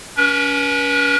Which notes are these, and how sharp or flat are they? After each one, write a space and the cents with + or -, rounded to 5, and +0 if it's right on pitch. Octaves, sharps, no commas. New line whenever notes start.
C#4 +35 B4 -40